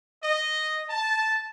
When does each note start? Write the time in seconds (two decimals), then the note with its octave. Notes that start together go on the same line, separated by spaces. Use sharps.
0.23 D#5
0.88 A5